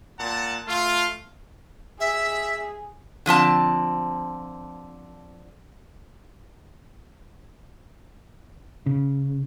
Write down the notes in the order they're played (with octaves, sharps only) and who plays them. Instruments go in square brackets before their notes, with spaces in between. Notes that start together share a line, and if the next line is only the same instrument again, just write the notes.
[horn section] A#2 F#5 A5
A3 F4
[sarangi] G#4 [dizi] E5
[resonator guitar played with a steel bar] D3 F3 C4 A5
[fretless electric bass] C#3